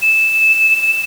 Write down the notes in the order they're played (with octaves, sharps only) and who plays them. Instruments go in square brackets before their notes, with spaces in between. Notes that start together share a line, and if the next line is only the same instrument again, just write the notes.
[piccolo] E7